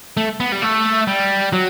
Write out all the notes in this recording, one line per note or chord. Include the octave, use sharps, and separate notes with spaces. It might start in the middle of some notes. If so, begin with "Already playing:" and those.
A3
B3
G3
A3
G3
F#3